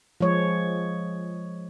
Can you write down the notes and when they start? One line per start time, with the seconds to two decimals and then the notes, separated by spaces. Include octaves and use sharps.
0.21 F3 G#3 C#5